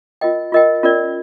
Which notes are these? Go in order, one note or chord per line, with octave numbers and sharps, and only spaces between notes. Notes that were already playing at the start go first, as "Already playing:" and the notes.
F4 A#4 D#5 G5
F4 A#4 D#5 G5
C#4 F4 A#4 D5